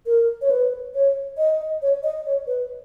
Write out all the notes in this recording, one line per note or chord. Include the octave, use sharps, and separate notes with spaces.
A#4
C#5
B4
C#5
D#5
D#5
C#5
D#5
C#5
B4